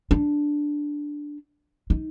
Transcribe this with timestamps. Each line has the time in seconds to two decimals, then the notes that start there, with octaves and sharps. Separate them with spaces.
0.11 D4
1.90 D#4